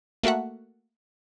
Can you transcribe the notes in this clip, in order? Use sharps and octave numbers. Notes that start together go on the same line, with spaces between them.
A3 A#3 F#4 E5 F#5